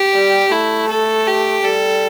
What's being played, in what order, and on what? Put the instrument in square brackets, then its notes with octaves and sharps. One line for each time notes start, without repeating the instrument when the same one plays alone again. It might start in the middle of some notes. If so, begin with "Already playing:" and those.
Already playing: [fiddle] G4
[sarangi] G3
[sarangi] A3 [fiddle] E4
[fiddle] A4
G4
[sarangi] G3 [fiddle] A4